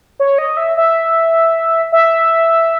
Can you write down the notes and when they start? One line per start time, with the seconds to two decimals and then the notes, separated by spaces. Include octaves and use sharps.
0.20 C#5
0.38 D#5
0.57 E5
0.77 E5
1.92 E5